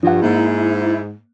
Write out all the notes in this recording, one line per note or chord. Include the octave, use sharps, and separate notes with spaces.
G2 F3 F#5
G#2 A#3 E4